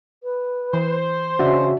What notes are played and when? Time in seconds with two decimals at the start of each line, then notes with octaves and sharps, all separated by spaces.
0.23 B4
0.73 E3 C5
1.39 C#3 D4 F#4 E5